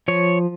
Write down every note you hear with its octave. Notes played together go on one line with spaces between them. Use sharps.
F3 C#5